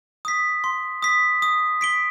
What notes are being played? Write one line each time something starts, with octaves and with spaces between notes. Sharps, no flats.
D#6 B6
C6
D#6 B6
D#6
B6 D7 G7